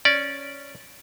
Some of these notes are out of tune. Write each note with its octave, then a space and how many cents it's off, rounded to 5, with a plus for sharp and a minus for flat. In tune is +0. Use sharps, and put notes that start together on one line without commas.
C#4 +0 D5 -10